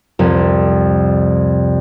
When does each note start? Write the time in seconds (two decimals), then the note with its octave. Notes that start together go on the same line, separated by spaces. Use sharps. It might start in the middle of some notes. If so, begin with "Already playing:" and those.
0.19 C2 F2